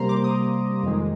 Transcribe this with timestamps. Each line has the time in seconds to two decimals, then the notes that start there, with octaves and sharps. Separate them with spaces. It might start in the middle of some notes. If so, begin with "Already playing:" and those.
Already playing: C3 G3 A#3 C5 A#5 C6
0.09 D6
0.24 D#6
0.83 F2 D#3 G#3